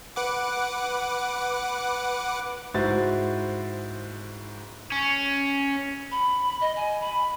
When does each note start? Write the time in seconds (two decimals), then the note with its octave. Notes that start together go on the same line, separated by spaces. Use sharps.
0.16 B4 F#5 D6
2.74 G#2 E4 F#4 C5 A6
4.92 C#4
6.11 B5
6.61 D#5
6.76 G#5
7.01 B5